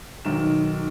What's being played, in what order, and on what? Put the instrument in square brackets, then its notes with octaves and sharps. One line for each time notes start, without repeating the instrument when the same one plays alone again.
[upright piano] B1 D#3 E7